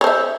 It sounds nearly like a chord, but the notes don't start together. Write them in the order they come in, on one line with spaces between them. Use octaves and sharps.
C#5 C5 E5